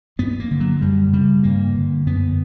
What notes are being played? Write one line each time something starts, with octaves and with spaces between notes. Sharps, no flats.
G2 B3
A#3
D3
F#3
F#2 G3
C#3 G3
G2 A#3
D3
F#2 B3